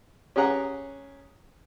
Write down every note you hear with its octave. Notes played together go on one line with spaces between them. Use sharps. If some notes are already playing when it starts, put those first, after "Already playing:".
C#4 G4 G#4 F#5 A#5